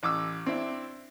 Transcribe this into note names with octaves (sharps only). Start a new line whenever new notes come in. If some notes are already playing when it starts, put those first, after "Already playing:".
A1 D6 E6
C4 D4 E4